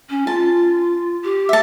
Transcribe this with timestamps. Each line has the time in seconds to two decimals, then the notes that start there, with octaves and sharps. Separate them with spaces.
0.10 C#4
0.27 F4 A5
1.24 G4
1.49 E5 A5